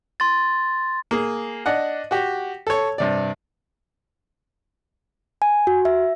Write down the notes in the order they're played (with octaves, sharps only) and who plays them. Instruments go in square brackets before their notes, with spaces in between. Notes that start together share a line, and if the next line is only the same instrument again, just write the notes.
[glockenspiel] C6 A6
[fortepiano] A#3 G#4
D4 D#5 F#5
F#4 G4
A4 C#5
G2 C3 D5
[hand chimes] G#5
F#4
E5